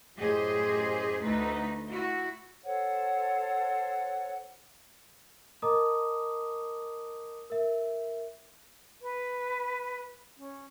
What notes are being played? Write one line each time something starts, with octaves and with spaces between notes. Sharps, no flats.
F#2 A2 G4 G#4 C5 D#5
D2 A3 D#4 B4
E4 F#4
A4 C5 C#5 F#5
A#4 D#5 A5 A#5 D6 D#6
A#4 E5
B4
C#4